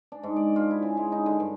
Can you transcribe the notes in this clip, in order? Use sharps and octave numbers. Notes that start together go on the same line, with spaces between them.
D4
G#2
D5
F4
E4
C#3
G#3
D#4
D3
G2